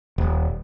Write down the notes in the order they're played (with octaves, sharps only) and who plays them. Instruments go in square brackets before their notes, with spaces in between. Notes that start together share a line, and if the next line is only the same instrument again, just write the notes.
[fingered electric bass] D#1